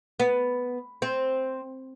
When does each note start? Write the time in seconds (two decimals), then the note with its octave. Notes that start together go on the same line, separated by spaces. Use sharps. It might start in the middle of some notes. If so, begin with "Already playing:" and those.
0.20 B3
1.02 C4